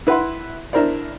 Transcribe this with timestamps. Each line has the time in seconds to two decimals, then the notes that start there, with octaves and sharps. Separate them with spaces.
0.07 E4 B4 E5 F#5 C6
0.73 D4 E4 A#4 C5 D5